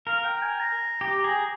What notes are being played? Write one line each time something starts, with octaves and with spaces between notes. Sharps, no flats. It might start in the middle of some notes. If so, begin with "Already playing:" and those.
A#4 F5
G5
G#5
A#5
G4
G#4